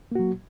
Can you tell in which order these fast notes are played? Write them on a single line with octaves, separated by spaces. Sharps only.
A#3 F#4 F#3